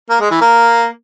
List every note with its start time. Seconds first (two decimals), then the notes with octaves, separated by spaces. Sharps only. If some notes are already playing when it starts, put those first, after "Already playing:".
0.10 A#3
0.20 G#3
0.31 E3
0.41 A#3